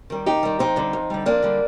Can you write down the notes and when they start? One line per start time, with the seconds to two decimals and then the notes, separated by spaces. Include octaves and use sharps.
0.10 D#3 G3
0.26 D#2 D#4 G4
0.43 D#3 G3
0.59 F2 C4 D#4
0.76 D3 G3
0.93 F2
1.10 D3 G3
1.26 F2 A#3 D4
1.43 D3 G3